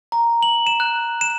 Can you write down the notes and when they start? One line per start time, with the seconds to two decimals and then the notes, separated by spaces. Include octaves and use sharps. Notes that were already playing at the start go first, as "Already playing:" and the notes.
0.12 A#5
0.43 F#7
0.67 E7
0.80 F#6
1.21 E7